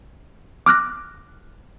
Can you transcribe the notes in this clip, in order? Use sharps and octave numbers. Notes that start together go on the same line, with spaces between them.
D6 F6 F#6 A#6